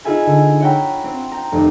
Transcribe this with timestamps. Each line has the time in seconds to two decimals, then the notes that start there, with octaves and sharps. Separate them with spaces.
0.05 D#4 F4 G#4 E5 G#5 B5
0.26 D3
0.60 C#5 E5 F#5 G5 A#5 B5
1.04 C4
1.32 G5 A#5
1.52 F1 D#2